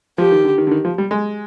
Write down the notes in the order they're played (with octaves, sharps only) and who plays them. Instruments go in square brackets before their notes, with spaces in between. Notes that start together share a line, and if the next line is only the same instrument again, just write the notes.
[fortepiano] F3 [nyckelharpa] G4
[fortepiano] D#3
D3
D#3
D3
D#3
F3
G3
G#3